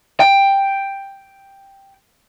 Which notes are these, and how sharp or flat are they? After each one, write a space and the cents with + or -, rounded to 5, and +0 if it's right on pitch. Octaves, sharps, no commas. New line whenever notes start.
G5 +5